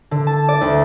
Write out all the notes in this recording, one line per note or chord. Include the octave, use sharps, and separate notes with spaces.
D3
A5
D5
D2